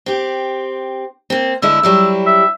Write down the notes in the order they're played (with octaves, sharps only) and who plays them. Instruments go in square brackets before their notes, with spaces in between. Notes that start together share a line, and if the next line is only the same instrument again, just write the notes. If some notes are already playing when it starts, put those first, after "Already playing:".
[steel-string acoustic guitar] C4 G4
A#3 C4
[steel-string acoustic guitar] D3 G#3 E4 [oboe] E6
[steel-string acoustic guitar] F#3 G3 E4
[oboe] E5